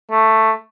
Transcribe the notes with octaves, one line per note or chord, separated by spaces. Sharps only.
A3